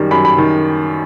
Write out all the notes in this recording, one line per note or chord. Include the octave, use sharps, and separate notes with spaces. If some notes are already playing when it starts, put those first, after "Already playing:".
Already playing: F#2 D#3 G3
F#2 B5
B5
D#3